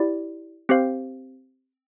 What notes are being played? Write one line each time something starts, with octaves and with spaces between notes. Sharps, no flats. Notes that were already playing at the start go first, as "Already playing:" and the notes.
Already playing: E4 G4 D5
C4 G4 C5 F5